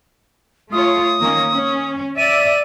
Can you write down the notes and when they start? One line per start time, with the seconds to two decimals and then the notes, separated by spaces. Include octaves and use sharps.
0.72 A3 F4 C#5 D#6
1.19 D#3 A#3 C#4
1.53 C#4
2.18 D5 E5 D#7